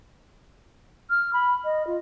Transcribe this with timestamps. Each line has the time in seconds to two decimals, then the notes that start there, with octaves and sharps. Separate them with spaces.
1.10 F6
1.33 B5
1.64 D#5
1.87 F4